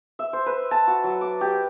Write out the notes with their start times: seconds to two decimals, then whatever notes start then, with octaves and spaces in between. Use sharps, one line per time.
0.19 E5
0.33 C5
0.46 B4
0.71 A5
0.87 F#4
1.04 F#3
1.21 D6
1.41 G4